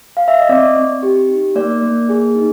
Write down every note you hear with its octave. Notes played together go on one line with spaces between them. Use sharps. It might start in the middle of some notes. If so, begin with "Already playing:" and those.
F5
E5
D#5
C4 D5
C4
G4
D#4
A#3 D5
A#3
G#4
D#4